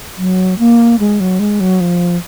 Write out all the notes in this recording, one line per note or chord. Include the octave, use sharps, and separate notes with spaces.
F#3
A#3
G#3
F#3
G#3
F#3
F3